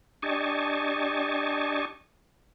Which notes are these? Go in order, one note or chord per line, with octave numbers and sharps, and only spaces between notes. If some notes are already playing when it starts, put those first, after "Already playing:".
D4 G4 D#5 G#5 A5 C#6